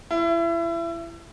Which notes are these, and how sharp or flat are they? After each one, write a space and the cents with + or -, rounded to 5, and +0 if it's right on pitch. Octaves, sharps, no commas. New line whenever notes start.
E4 +30